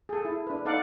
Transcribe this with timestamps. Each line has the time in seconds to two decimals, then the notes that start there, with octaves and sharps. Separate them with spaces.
0.09 G#4 A4
0.25 E4
0.47 D4 B4
0.65 D#4 A4 D5 F5 F#5